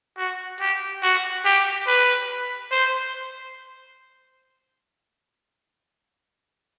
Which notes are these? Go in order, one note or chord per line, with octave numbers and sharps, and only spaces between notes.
F#4
G4
F#4
G4
B4
C5